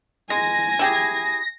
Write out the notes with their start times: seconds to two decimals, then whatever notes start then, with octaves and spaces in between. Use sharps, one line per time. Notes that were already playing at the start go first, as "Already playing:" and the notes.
0.30 G#3 G#5 A#6
0.79 E4 G4 G#4